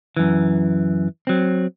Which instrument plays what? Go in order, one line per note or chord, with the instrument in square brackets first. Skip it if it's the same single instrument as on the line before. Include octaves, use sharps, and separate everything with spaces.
[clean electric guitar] F#2 E3
F#3 C4